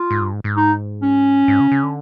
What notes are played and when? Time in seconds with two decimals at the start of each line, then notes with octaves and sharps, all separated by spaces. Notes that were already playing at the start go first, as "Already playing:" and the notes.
Already playing: F4
0.11 G#2
0.21 G2
0.33 G#2
0.44 G#2
0.56 D#4
1.02 C#4
1.48 G#2
1.60 C#3
1.72 C#3
1.83 D3